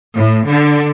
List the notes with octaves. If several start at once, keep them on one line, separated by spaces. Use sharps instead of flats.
A2
D3